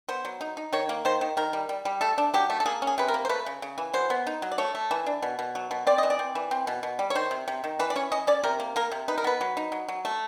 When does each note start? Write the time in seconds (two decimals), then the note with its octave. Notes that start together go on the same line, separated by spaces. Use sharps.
0.09 B3 C5
0.25 F#3
0.41 D#4
0.57 D#4
0.73 D#3 C#5
0.89 A#3
1.05 D#3 C5
1.21 D#3
1.37 D#3 A#4
1.53 G3
1.69 G3
1.85 G3
2.01 A3 A4
2.18 D4
2.34 F#3 G4
2.50 A3
2.60 A4
2.66 A#3 G#4
2.82 C#4
2.87 G#4
2.98 C3 B4
3.08 A#4
3.14 A#3
3.25 C5
3.29 A3 B4
3.46 C#3
3.62 C#3
3.78 E3
3.94 F#3 C5
4.10 B3
4.27 D#4
4.42 F#3
4.52 D5
4.58 A3 C#5
4.75 A3
4.91 E3
5.06 D4
5.22 B2
5.39 B2
5.55 F#3
5.71 B2
5.87 C4 D5
5.98 E3 D#5
6.10 D5
6.19 C4
6.35 E3
6.51 C4
6.67 B2
6.83 B2
6.99 G3
7.10 C#5
7.15 D#3 C5
7.31 C3
7.48 C3
7.64 D#3
7.79 E3 B4
7.90 D5
7.96 C#4 C#5
8.12 C#4 D#5
8.27 C#4 D5
8.44 C3 A#4
8.60 A#3
8.76 A#3 A#4
8.92 C3
9.08 D#4 B4
9.18 A#4
9.24 B3 B4
9.41 F#3
9.57 D#4
9.72 F#3
9.88 F#3
10.05 A3